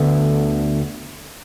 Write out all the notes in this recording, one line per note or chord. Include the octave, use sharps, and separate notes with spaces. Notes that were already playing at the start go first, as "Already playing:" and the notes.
Already playing: D2 D3 B3